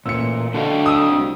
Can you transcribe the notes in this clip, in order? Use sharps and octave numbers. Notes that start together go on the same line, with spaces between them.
A1 A#2 E6 C#7
D3 D4 F#4 F5
D#6 E6
C2